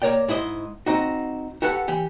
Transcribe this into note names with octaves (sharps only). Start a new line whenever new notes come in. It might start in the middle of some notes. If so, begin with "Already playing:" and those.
A#3 A#4 C#5 D5 G5
G#2 E4 C5 D#5
C4 D#4 F#4
F#4 G4 A4 B4 F#5
E3 G4